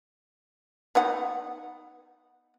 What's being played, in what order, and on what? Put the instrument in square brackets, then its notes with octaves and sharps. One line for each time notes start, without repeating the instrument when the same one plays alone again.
[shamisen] B3 D#4 F#5